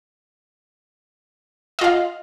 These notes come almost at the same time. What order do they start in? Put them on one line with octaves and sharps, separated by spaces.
D#5 F4 F5